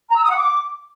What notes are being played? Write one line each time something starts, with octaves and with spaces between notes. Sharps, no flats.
A#5
E6
D#6
F#5
D6